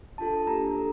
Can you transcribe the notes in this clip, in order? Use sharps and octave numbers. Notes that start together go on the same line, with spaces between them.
D4 F4 A4 A5
A#3 D4 G4 A#5
D4 A4